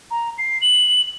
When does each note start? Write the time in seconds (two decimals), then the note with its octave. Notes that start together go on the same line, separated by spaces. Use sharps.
0.11 A#5
0.38 C7
0.62 F#7